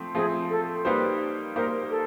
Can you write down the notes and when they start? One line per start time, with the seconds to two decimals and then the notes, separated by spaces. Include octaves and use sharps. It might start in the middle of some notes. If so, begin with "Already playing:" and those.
Already playing: F3 A3 C4
0.15 F3 A3 C4 G#4
0.50 A4
0.85 G3 A#3 D#4 G4 B4 C5
1.56 G3 A#3 D#4 G4 A#4 C5
1.90 A4